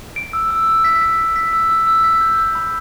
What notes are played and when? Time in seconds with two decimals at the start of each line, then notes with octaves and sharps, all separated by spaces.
0.16 D7
0.33 E6
0.51 E6
0.67 E6
0.84 B6
1.01 B6
1.18 B6
1.36 B6
1.53 E6
1.70 E6
1.87 E6
2.04 B6
2.21 G6
2.38 E6
2.55 B5